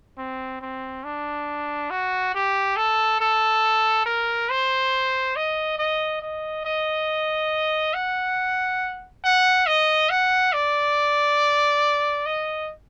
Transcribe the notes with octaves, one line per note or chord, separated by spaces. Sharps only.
C4
C4
D4
F#4
G4
A4
A4
A#4
C5
D#5
D#5
D#5
D#5
F#5
F#5
D#5
F#5
D5
D#5